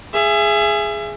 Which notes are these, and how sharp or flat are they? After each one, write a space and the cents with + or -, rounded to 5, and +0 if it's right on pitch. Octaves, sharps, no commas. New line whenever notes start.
G#4 +0 E5 +30